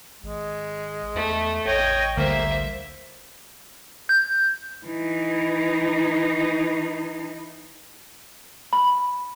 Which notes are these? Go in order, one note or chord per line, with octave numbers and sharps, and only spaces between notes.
G#1 G#3
E2 A3
A1 C#5 D#5 G5
D2 D3 G3 A#3 C5 E5
G6
E3 D#4
B5